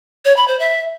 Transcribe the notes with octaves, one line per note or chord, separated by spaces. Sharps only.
C#5
B5
C5
E5